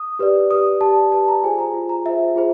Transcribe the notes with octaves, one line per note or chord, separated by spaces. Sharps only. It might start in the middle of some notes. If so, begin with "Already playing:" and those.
Already playing: D#6
G4 B4 D5
G4 B4 D5 D#6
G4 B4 D5 A5
G4 B4 D5 A5
A#5
F4 G#4 C5 G#5
A#5
F4 G#4 C5
A#5
F4 G#4 C5 E5
F4 G#4 C5